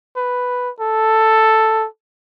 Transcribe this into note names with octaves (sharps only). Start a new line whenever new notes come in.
B4
A4